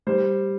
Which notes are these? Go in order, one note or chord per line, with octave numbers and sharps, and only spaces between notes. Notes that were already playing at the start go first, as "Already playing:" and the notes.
G3 C5